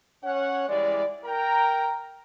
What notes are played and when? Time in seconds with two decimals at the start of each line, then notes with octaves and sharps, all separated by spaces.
0.24 C#4 C#5 F#5
0.69 E3 G3 G#3 E4 D5
1.25 A#4 G5 A#5